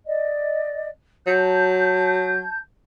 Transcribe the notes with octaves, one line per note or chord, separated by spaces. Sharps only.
D5 D#5
F#3 A5 G6